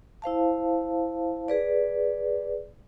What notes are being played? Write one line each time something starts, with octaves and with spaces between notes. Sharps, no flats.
E4 C5 F5 A5
G#4 B4 D5